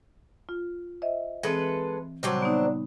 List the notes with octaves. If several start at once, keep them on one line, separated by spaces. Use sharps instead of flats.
F4
C5 D#5 E5
E3 G#3 C4 A4 B4
A#2 C#3 F#3 G3 C4 D4
B3 D#4